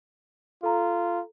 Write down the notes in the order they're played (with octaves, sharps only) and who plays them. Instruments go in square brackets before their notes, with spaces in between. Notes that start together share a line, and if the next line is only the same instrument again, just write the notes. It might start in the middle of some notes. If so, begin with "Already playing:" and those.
[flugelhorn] F4 [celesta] A4 A#5